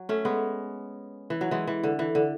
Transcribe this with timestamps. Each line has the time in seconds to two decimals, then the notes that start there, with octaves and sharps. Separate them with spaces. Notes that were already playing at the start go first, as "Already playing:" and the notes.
Already playing: F#3
0.09 A3 C#4
0.25 G#3 B3
1.30 E3
1.41 F#3
1.51 E3 G#3
1.67 E3
1.83 D3
1.99 E3
2.15 D3